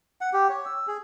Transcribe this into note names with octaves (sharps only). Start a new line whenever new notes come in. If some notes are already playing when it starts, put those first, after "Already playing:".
F#5
G4
C#5
E6
G#4